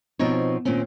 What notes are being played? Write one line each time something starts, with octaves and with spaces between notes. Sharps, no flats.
B2 F3 C4 D#4 C#5
A#2 D#3 C4 C#4